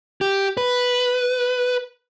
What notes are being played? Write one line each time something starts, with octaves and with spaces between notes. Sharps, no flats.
G4
B4